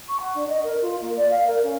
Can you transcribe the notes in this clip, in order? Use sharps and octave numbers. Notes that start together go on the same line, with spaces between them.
C#6
F#5
D4
D#5
A#4
F4
A#3
D5
F5
A#4
C#4